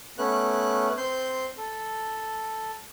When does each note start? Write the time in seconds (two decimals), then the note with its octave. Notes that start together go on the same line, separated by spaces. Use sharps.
0.18 A3 B3 C#4 F#6
0.97 C4 C6 G6
1.58 A4